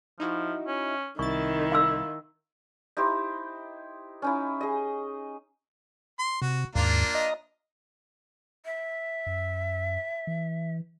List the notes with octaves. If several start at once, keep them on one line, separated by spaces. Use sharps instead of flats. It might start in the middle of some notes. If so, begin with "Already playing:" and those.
F3 D#4 E4 F#4
C#4
C2 D#3 E4 C#6 A6
F5 C6 E6
D#4 E4 G4 C5
C#4 D#4 E4
G#4 D#5
C6
C3 F#4
D#2 G#2 A#3 D4 F4
D#5 A#5
E5
F#2
E3